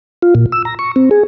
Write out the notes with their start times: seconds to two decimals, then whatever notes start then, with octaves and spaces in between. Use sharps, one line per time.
0.22 F4
0.35 A#2
0.52 E6
0.65 A#5
0.79 C#6
0.96 C4
1.11 G#4